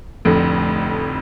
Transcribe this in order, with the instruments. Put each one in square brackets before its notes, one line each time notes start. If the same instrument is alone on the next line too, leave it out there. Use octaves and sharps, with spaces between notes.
[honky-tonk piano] F1 F2 A2 D3